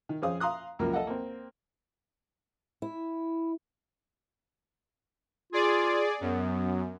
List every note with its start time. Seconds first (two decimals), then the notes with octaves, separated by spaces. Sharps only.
0.09 D#3
0.22 F2 C#4 G#4 C5 F5 D#6
0.40 F5 A#5 C6 D#6 F#6
0.79 C#2 F#2 F3 A#3 A#4
0.93 A4 D#5 F5 F#5
1.07 A#3 C4
2.82 E4
5.53 F4 G#4 D5
6.21 F#2 B3